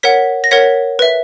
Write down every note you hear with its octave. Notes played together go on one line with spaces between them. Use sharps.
A#4 C#5 F#5 B6
A#6
A#4 C#5 F#5 B6
B4 E5